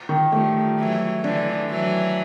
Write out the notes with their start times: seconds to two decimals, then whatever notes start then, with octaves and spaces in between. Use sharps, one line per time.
0.09 D#3
0.32 F3 G3 A3
0.78 E3 F#3
1.24 D3 E3 D4
1.69 E3 F#3